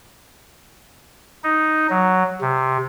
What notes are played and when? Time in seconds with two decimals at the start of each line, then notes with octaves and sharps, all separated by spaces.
1.44 D#4
1.90 F#3
2.41 C3